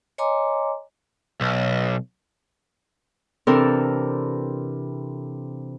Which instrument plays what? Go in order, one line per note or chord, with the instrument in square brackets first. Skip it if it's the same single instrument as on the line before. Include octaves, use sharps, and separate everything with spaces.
[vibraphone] C#5 D#5 G#5 A#5 C6 D6
[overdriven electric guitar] B1
[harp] C3 E3 C4 D4 A4 A#4